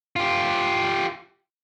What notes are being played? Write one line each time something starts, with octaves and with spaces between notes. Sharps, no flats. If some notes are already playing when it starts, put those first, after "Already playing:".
F4 G4